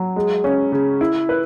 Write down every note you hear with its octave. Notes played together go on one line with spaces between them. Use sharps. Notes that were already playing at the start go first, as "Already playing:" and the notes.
Already playing: F#3
G#3
C#4
C#3
E4
B4